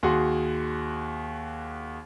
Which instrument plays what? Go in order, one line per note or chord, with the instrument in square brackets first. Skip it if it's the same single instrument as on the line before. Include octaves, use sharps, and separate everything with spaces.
[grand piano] D#2 F#4 G#4 C6